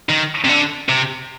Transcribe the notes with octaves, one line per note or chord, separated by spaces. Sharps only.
D#3
C3
D3
C3